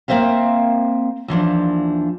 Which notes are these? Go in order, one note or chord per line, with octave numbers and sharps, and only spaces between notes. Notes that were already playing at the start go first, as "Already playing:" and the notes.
A#3 C4 C#4 C5 E5 F5
D#2 E3 F3 D4